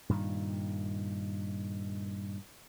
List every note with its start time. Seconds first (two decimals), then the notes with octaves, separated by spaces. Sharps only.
0.09 G2 A#2 D#3